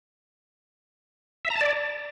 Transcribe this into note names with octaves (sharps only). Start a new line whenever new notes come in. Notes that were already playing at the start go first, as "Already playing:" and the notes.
E5
A#5
A5
D5